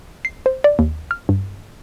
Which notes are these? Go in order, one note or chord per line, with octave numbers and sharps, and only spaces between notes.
C7
C5
D5
D#2
F6
G2